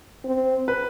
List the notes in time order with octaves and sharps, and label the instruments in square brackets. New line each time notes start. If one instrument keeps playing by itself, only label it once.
[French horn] C4
[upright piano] B4